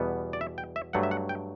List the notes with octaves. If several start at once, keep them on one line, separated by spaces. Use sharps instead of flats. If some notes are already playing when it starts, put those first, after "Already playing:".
Already playing: E2 B2 G3 B3
D5
E5
G5
E5
G2 F#3 A3 F#5
E5
F#5
G5